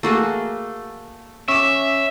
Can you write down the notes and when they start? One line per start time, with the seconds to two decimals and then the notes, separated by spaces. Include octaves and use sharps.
0.03 A3 A#3 F#4 G#4
1.48 C#4 E5 C#6 D6